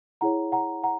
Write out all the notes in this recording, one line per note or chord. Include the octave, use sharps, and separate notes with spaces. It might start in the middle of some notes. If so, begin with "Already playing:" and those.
E4 G#4 C#5 F#5 A#5
F#5 A#5
F#5 A#5